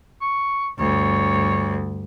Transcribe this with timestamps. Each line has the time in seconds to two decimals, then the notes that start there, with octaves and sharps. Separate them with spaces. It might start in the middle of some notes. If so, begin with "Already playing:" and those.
0.21 C#6
0.79 D2 G2 C#5